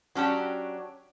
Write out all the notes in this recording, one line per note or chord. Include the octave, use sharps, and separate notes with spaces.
F#3 C#4 D4 G4